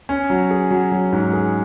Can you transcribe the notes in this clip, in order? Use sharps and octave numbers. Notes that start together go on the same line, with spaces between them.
C#4
F#3
G#4
F#3
F#3
G#2
G#4